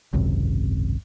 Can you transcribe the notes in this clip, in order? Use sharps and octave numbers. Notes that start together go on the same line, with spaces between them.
G#1 C#2 F#2 C3